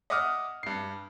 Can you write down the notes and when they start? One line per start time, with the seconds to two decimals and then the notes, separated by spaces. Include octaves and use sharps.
0.10 D#5 E5 F#5 D6 D#6 F6
0.63 G2 C7